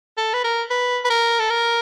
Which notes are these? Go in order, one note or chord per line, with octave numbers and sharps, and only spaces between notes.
A4
B4
A#4
B4
B4
A#4
A4
A#4